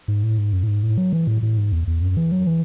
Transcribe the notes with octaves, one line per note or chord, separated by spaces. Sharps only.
G#2
A2
G#2
F#2
A2
G#2
A2
F#3
E3
A2
A2
G#2
E2
E2
F#2
E3
F#3
E3